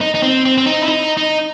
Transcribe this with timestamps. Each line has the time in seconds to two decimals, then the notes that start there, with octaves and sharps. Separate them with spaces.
0.01 D#4
0.14 D#4
0.23 C4
0.45 C4
0.58 C4
0.67 D#4
0.81 E4
0.88 D#4
1.17 D#4